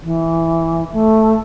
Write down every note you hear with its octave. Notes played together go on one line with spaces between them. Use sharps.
E3
A3